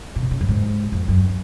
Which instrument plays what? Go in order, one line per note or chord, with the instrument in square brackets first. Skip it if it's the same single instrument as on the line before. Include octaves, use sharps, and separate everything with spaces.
[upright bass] A#2
C3
C#3
F#2
G#2
F2
F#2